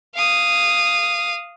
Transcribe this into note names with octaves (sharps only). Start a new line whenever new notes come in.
F5 D#6